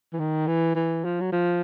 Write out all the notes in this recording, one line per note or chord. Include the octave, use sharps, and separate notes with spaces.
E3
D#3
E3
E3
F3
F#3
F3